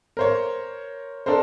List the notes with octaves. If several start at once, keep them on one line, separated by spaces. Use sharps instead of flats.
A#4 C5 C#5
D4 A4 A#4 C5